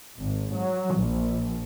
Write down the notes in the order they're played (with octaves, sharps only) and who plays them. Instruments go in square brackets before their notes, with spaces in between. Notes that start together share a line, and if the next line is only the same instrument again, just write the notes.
[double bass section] G#1
F#3
A#1